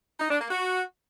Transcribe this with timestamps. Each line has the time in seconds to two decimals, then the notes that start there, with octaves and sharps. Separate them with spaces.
0.19 D#4
0.30 D4
0.40 A#3
0.50 F#4